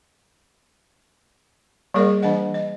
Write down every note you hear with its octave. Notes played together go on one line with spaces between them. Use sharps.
G3 A#3 G#4 A#4 D5 D#5
E3 D4 D#5 F#5
D#5